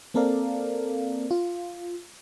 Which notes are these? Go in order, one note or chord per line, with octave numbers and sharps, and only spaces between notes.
A#3 C4 A4 A#4 D5 F5
F4